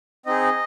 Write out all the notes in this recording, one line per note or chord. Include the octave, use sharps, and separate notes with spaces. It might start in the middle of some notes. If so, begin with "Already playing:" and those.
C4 D#4 G#4 D#5